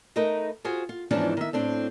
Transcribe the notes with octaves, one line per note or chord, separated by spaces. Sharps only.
A3 D#4 A#4 B4 D#5
F4 F#4 G#4 C5
F4
E2 G#2 E3 F3 C#4 D4
D#3 E5
A2 C4 D4